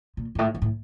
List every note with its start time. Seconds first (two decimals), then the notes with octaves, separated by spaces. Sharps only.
0.17 A#2
0.35 G2
0.39 A2
0.54 G2
0.62 A2